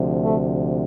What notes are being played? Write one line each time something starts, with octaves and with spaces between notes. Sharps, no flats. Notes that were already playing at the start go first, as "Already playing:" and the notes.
Already playing: D2 C3 F3
A3